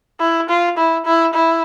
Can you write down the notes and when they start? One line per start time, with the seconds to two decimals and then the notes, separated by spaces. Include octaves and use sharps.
0.20 E4
0.49 F4
0.77 E4
1.05 E4
1.34 E4